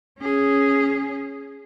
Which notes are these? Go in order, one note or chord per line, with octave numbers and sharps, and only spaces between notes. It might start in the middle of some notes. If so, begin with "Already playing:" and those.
C#4 G#4